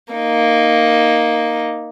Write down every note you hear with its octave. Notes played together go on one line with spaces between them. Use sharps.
A#3 D#4